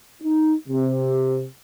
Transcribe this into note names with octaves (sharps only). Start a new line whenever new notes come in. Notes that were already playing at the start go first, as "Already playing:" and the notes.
D#4
C3